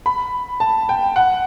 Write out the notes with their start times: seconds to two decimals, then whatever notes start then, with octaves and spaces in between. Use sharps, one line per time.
0.06 B5
0.60 A5
0.89 G5
1.16 F#5